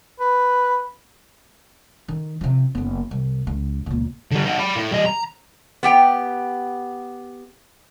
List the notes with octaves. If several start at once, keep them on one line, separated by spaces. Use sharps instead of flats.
B4
D#3
C3 F3
F#1 B3
C2
C#2
C#2 A#2
D3 G3
D#4 F#4
D5 B5
A2
G3 D#5
A#5
B3 G4 G5